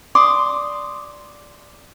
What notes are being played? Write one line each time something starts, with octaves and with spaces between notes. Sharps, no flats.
D5 C6 D6 D#6